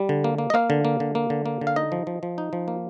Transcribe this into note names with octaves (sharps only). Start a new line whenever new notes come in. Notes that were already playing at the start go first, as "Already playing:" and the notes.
Already playing: G3
D3
A#3
A#3
D#5
A#3 F5
D3
A#3
D3
A#3
D3
A#3
D3
F5
D#4 D#5
F3
F3
F3
D#4
F3
A#3